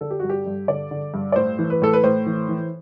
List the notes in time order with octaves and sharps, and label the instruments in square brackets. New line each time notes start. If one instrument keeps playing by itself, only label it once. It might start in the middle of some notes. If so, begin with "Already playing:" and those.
[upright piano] D3 A4
G4
G2 F#4
G4
G2
D3 D5
D3
G2
D5
A2 C5
E3
B4
A2 A4
B4
A2 C5
E3
E3